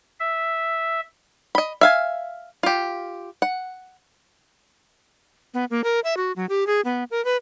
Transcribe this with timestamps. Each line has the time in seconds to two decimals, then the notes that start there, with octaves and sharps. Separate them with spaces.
0.20 E5
1.55 D#5 B5
1.81 E5 F5 G#5
2.63 F4 G4
3.42 F#5
5.54 B3
5.71 A#3
5.84 A#4
6.04 E5
6.17 F#4
6.36 F#3
6.49 G4
6.67 G#4
6.85 B3
7.11 A#4
7.25 B4